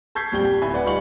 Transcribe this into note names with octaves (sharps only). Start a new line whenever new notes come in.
A5 C#6 G6 G#6 B6 C7
A#1 F2 G3 G4 G7
G4
D1 E5 G#5 B5
B4 D5 F#5 B5
G3 D#4 F4 C#6 C#7 F#7